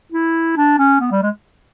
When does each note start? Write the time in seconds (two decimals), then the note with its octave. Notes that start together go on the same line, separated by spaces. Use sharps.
0.12 E4
0.57 D4
0.78 C#4
1.01 B3
1.11 G3
1.22 G#3